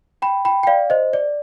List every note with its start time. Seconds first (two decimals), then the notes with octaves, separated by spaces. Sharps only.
0.22 G5 B5
0.45 G5 B5
0.63 G5
0.67 D5 F5
0.90 C5 D#5
1.13 D5